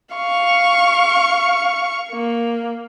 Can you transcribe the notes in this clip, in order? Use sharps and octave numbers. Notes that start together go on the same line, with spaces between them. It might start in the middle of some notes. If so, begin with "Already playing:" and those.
F5 C#6
A#3